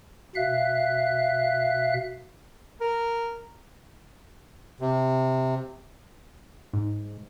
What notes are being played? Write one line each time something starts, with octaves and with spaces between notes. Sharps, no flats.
B2 E5 F5 F#6
A#4
C3
G#2